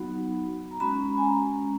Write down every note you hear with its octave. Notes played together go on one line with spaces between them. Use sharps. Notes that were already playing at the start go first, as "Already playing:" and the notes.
Already playing: F#3 B3 D#4 F#4
A#5
G#3 C#4 F#4 B5
G#5
A#5